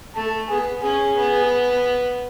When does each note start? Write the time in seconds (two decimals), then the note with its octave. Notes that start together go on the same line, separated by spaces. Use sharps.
0.15 A3 A4
0.49 B3 G#4
0.82 C#4 G#4
1.16 B3